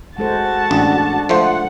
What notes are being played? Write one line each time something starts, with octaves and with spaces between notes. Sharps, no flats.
G#3 F#4 A4 C5 A5
A1 D4
F3 A3 C5 F#5